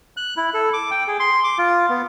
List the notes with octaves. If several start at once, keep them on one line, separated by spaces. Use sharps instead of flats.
F#6
E4
A4
D6
G5
G#4
C6
D6
F4
B3